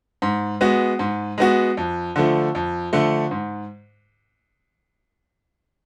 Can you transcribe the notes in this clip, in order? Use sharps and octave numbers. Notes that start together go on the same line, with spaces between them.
G#2
G#3 B3 F#4
G#2
G#3 B3 F#4
F2
D3 F3 A3
F2
D3 F3 A3
G#2